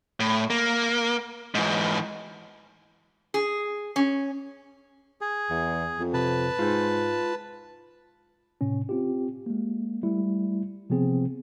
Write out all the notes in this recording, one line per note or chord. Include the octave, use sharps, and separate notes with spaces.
A2
A#3
G#2 E3
G#4
C#4
G#4
E2
F2
C3 B4 A5
G#2 F4
A2 C3 C#4
C4 F4 G4
G#3 A#3
G3 A3 E4
C3 F3 B3 C4 G#4